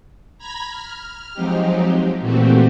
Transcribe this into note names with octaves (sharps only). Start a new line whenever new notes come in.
A#5 B5 G#6 A#6 B6
F6
F3 F#3 G#3 C4 D#4 G4
A#2 E3 A3 C4 F#4 G4